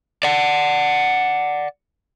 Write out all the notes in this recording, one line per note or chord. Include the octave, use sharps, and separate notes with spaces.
D5 F#5